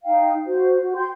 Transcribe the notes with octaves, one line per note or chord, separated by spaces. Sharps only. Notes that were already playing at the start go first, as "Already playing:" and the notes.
D#4 F5 G5
F#4 C5
F#4
G5 C6 G6